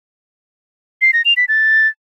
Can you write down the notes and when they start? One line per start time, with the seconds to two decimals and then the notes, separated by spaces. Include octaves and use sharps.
1.02 C7
1.13 A#6
1.25 F7
1.37 B6
1.48 A6